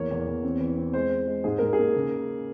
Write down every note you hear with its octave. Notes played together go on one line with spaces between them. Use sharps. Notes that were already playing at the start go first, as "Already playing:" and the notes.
Already playing: E2 A#3 C#5
E2
E2
C4
E3
C4
G#3 C5
G#3
G#3
G#2 G#4
G#2 A#4
G#4
A#3
C#3